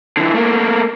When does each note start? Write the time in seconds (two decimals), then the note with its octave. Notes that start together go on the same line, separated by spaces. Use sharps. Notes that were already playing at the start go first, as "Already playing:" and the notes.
0.17 D3 E3
0.34 A3 A#3